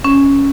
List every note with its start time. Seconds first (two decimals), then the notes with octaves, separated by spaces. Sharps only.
0.04 C#4